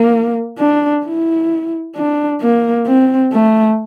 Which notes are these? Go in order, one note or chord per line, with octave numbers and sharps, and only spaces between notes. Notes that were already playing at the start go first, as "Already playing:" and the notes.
Already playing: A#3
D4
E4
D4
A#3
C4
A3